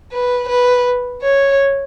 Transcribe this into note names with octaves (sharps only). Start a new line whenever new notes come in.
B4
B4
C#5